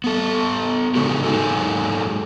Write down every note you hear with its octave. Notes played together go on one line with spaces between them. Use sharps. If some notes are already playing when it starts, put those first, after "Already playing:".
B3 A4
C#3 G#3 B3 D4 F#4 G4
G#2 C3 F#3 D#4 G#4 A4